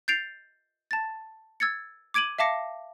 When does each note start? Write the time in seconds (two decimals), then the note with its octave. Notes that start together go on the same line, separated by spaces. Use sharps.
0.08 G6 A6 C7 D7 F7
0.91 A5 A6
1.60 E6 G#6 A6 C#7
2.14 D6 G#6 D7 D#7 F#7
2.39 E5 F5 A5 D6 A#6 C#7